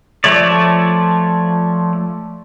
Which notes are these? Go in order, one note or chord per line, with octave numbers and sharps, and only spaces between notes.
F3 A3 C#5 D5